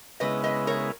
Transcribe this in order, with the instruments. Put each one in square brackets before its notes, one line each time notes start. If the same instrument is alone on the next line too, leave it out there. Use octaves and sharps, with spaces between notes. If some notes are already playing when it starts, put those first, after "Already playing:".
[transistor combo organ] C#3 G#3 B3 E4 [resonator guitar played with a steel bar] B4 D#5
[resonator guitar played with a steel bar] B4 D#5
A#4 C#5